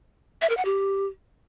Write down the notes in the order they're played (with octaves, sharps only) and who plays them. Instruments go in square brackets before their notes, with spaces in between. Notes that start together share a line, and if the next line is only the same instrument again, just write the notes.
[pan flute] E5
A#4
F#5
G4